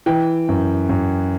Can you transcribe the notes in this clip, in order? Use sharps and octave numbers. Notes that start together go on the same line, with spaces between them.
E3 G5
F#2
F#2